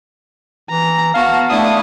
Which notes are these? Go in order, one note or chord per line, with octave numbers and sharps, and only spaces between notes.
E3 A#5
B3 F#4 F5 A5
A3 D4 E4 D#6